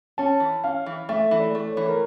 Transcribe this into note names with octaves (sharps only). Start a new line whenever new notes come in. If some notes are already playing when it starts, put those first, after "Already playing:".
C#4 A5
E3
C#4 F5
E3
A3 E5
E3
D5
A3
C#5
E3
A#4